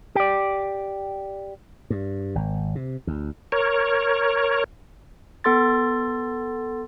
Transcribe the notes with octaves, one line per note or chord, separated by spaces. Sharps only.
G4 D5
G2
G#1
C3
D2
A#4 C#5
B3 A4 C6 A6